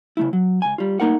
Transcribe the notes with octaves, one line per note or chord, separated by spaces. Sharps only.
C#3 A3 E4
F#3
C#2 G#5
G3 F4
A3 A#3 D#4 A#4 F#5